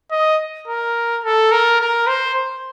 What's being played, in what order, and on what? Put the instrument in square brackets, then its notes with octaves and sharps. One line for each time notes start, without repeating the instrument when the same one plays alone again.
[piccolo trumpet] D#5
A#4
A4
A#4
A#4
C5